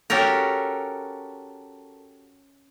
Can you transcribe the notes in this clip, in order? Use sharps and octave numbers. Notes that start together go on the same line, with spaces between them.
C#4 F#4 G4 A4 A#4